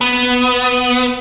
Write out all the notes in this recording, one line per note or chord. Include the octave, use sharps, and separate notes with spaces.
B3